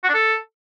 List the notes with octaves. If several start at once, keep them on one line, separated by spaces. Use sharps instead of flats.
F#4
D4
A4